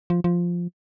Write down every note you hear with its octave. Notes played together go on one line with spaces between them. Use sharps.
F3
F3